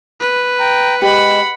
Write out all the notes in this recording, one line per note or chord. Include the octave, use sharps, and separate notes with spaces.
B4
G5 A#5
G#3 G4 F#5 B5